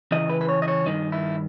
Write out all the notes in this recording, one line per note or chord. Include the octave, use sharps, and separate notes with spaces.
E2 C#3 E3 D#5
B4
B4
C#5
D#5
C#5
G2 D#3 D#4
E4